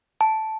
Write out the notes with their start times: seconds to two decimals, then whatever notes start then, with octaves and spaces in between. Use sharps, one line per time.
0.21 A5